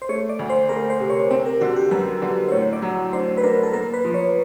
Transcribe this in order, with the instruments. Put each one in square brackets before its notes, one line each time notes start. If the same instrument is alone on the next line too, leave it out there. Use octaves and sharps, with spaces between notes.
[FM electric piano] C5
[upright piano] A3 [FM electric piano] C#5
[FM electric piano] D5
[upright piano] D2
[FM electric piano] C5
[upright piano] A3 [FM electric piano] A#4
[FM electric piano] C5
[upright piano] C3
[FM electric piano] C#5
[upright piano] C4 [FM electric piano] C5
[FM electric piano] A#4
[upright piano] D3 [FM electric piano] F#4
[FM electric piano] G4
[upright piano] F#2 [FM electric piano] B4
[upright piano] D3
[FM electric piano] C5
[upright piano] A2 [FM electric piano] C#5
[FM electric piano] D5
[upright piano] F#3
[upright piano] D4 [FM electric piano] C5
[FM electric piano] B4
[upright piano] D4 [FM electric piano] A#4
[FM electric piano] A4
[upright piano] A#3 [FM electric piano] A#4
[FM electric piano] B4
[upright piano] F3
[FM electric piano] C#5